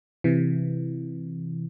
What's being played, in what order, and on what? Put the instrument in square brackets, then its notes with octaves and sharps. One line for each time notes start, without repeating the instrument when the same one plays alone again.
[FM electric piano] C3 E3